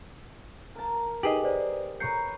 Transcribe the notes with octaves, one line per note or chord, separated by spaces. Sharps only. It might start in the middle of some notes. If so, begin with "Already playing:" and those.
A#4 A5
D#4 G4 G#4 B4 D#5 F#7
B4 C5 D5
B4 C#5 A#5 G6 C7 C#7